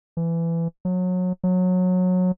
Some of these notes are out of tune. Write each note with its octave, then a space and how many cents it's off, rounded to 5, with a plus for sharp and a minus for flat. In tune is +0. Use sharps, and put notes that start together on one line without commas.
E3 +20
F#3 -25
F#3 -20